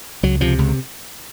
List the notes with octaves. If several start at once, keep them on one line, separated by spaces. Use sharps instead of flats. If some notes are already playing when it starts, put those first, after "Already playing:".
C#2 F#3
C3 F3
C#2